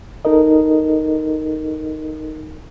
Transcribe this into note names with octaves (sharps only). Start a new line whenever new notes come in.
D#4 A4 A#4 D#5